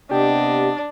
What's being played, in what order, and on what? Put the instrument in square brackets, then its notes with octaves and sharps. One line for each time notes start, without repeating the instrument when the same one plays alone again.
[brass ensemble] C3 B3 D#5 [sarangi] D4 [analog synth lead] G4